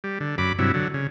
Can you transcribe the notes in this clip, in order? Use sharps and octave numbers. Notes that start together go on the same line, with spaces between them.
G3
D3
F#2 B5 D6
G2 C3 F#3 E4
D3 F#3
C#3